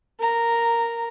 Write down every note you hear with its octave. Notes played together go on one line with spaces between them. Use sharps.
A#4 A#5